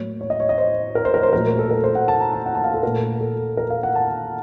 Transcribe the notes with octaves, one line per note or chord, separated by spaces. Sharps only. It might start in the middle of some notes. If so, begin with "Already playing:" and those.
Already playing: A2 F#3 A#3 C#5
C#5
D#5
C#5
D#5
C5
A#4
C5
A#4
C5
A#2 F#3 A3 A#4
A4
A#4
C5
F#5
A5
A#5
A5
F#5
A5
F5
A4
A#2 A3 A#4
A4
A#4
F5
F#5
A5